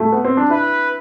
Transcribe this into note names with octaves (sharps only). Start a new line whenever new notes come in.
A3
B3
C4
D4
E4 B4